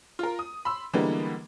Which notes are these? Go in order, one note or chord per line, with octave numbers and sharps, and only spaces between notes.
F4 A#4
D#6
B5 C6 E6
D3 E3 G3 G#3 A#3 B3